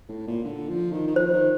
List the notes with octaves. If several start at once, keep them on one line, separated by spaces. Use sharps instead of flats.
A2
A#2
D3
F3
D#3
D#3
F3 C5
D#3